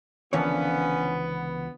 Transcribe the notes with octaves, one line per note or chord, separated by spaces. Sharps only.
C#2 D3 E3 F3 A#3 B3 C#4 C#5